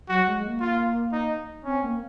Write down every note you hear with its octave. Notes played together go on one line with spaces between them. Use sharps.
F#3 F#4
G#3
A#3
F4
D#4
C4 C#4
A#3